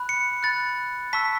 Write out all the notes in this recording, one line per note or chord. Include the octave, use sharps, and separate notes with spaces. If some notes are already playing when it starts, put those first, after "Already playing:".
Already playing: B5 F#6
C#7
B5 F#6 A6
A5 C#6 E6 B6